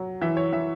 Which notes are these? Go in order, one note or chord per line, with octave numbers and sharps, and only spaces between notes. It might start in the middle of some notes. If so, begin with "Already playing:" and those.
Already playing: F#3
E3 E5
C#5
E3 E5